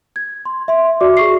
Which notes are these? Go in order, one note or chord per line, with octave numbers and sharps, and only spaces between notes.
G#6
C6
E5 C6
F#4 D5 E5 D6
G#4 C#6 C7